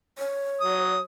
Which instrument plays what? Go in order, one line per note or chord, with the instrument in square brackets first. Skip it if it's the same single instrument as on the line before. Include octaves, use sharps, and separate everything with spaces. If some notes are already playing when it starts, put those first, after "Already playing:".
[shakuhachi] C#5
[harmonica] F#3 D#6